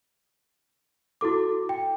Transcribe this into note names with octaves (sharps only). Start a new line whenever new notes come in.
E4 F#4 A4 D6
G5